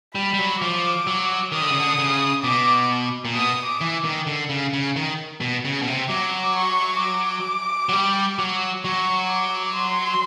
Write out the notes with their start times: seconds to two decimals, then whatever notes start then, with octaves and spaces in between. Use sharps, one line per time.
0.15 G3 B5
0.34 G3
0.39 F#3
0.61 F3 D6
1.07 F#3
1.52 D#3 D#6
1.62 D3
1.71 C#3
1.79 D3
1.99 C#3
2.44 B2 D6
3.25 A#2
3.35 B2 D#6
3.65 D6
3.81 E3
4.04 D#3
4.27 D3
4.50 C#3
4.73 C#3
4.96 D#3
5.41 B2
5.65 C#3
5.82 B2
5.88 C3
6.09 F#3 D6
6.56 C#6
7.01 D6
7.89 F#3
7.93 G3
8.39 F#3
8.85 F#3 C#6
9.30 D6
9.76 C6